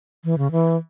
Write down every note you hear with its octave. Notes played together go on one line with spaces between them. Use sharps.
E3
C#3
E3